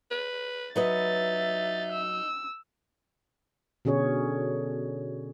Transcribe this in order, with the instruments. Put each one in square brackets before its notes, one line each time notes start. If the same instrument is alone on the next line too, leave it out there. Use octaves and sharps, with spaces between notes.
[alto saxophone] B4
[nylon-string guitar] F#3 B4 D#5 [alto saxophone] D#4 [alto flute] E5 [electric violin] A6
[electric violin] E6
[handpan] B2 D3 C#4 G#4 C#5